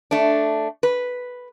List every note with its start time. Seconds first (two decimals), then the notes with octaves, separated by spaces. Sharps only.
0.11 A3 D4
0.83 B4